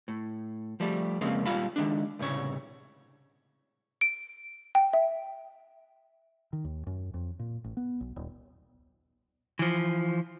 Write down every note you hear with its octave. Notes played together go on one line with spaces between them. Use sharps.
A2
F3 G3 A3
F2 C#3 G#3 A#3 C4
A#2 G3 F4 F5 B5
D#3 G#3 D4
C2 A2 C#3 C#5
D7
G5
E5
D#3
D#2
F#2
F2
A#2
A1
B3
B1
D#1
E3 F3